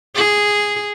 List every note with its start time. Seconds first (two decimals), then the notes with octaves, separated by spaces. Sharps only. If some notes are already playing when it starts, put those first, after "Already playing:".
0.15 G#4